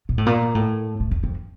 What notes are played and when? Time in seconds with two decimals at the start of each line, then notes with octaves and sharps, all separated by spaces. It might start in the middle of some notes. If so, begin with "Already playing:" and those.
0.09 A#2
0.18 A2
0.26 A#2
0.55 A2
1.00 A2
1.11 E2
1.24 F2